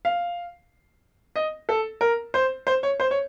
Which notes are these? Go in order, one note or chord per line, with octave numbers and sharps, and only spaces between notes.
F5
D#5
A4
A#4
C5
C5
C#5
C5
C#5